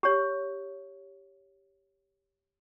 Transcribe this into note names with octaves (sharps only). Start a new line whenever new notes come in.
G4 C#5